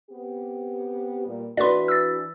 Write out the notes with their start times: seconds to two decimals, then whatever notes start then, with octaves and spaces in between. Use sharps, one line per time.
0.10 B3 C4 G4
1.26 A#2 G3
1.57 E3 D4 F#4 B4 D5 C6
1.88 E6 A6